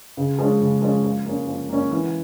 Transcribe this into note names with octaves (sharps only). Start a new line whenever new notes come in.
C#3
F3 G#3 C#4
C#3
F3 G#3 C#4
F3
A#3 C#4
F3
A#3 C#4
E3